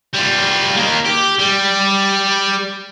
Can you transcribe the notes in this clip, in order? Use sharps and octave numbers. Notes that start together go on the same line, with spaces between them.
G3 F4
D#3 A#3
G4
G3